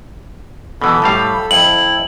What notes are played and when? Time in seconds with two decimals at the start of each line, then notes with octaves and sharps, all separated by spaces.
0.82 B2 E3 A4 B5
1.02 A2 G3 F5
1.51 F2 E4 F#7